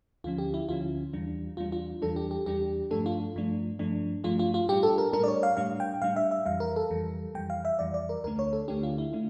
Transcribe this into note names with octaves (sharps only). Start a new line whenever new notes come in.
D2 D3 F3 C#4 F4
G4
E4
D2 D3 F3 C#4 F4
E2 E3 G3 D4
E2 E3 G3 D4 F4
F4
E2 E3 G3 D4 A4
G4
G4
E2 E3 G3 D4 G4
G2 F3 A3 D4 A4
F4
G2 F3 A3 D4
G2 F3 A3 D4
G2 F3 A3 D4 F4
F4
F4
A2 G3 D4 G4
A4
A#4
A2 G3 D4 A#4
D5
C#5
F5
A2 G3 D4 F5
G5
A2 G3 D4 F5
E5
E5
F2 E3 G3 F5
A#4
A4
F2 E3 G3
F2 E3 G3 G5
F5
E5
F2 E3 G3 D5
D5
A#4
D2 D3 A3 D4 A#4
C#5
A4
D2 D3 A3 D4 G4
F4
E4
D3 A3 D4